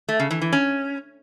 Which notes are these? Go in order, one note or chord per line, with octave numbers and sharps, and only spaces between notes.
A3
C#3
E3
E3
C#4